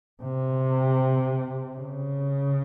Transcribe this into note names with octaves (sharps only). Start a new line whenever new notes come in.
C3
C#3